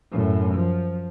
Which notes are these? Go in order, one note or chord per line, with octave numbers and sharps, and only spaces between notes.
F#2 A2
F3